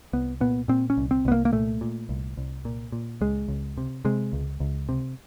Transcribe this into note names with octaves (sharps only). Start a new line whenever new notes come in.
C2 B3
A#2 B3
A#2 C4
C#4
C2
C4
C2 B3
A#3
A#3
A#2 A3
A#2
C2
C2
A#2
A#2
C#2 G#3
C#2
C3
C3 G#3
C#2
C#2
C3